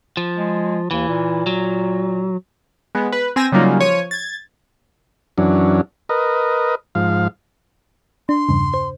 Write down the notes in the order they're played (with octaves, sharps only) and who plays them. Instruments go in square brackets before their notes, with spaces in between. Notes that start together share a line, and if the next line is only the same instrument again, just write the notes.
[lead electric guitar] F3
[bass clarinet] G#3
[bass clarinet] D#2 [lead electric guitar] E3
[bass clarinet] A#2
[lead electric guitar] F#3
[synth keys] G#3 B3
B4
C4 G#5 E6 A#6
C#3 F#3 G3 A#3 D#4 F4
F3 C#5 D#7
G#6 A6
[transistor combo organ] F#2 E3 F#3 C#4 D4
A#4 B4 D#5
G#2 F3 F5
[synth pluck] D4 [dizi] C6
[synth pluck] E2 G2 C#3
C5